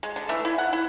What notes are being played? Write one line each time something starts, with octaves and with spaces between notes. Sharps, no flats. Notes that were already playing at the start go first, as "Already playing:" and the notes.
G#3
D3
E3 A3 E5
E4
F#5
E4